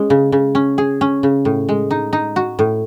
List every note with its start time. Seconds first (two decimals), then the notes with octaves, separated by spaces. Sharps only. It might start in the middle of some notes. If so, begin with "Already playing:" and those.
Already playing: G#3 C#4
0.10 C#3
0.32 C#3
0.55 C#4
0.78 G#4
1.01 C#4
1.23 C#3
1.45 A2
1.69 G#3
1.91 D#4
2.13 D#4
2.36 F#4
2.59 A2